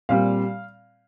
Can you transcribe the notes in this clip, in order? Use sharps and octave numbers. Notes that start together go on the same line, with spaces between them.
A#2 G3 C4 F5